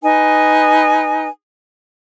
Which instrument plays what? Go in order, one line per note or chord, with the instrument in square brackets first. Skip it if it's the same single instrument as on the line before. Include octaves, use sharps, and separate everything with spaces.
[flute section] D#4 B4 G#5